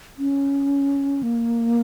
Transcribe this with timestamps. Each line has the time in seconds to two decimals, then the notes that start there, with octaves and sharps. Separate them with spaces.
0.18 C#4
1.23 A#3